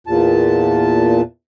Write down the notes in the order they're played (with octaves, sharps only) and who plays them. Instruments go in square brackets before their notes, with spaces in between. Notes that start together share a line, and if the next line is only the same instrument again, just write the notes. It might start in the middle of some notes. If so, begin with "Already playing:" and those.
[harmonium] E2 A#2 A5